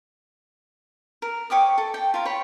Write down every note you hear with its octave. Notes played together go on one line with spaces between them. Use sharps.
A#4
C#5 G5 D6 D#6
A4
G5
F4 A#4 A#5
C#5 G5 B5